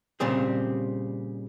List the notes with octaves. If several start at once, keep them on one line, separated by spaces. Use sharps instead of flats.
A#2 C#3 G3 C4 G#4